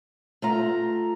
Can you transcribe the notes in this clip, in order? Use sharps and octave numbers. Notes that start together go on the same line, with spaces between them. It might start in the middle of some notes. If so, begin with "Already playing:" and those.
A3 F4 A#5